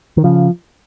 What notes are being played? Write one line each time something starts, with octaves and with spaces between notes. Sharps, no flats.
D#3
C#3 F3